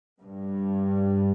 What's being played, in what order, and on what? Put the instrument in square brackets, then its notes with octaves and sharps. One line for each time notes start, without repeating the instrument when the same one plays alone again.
[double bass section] G2